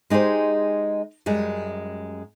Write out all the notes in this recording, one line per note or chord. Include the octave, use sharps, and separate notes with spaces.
G#3 D#4 G4 G#4 C5
F#2 G3 G#3